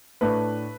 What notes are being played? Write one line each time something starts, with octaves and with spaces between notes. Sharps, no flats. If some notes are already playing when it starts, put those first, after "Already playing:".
A2 A3 D4 B4